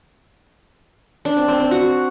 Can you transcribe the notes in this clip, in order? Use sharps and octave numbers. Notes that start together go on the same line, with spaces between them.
D4
C4
C4
C4
F#4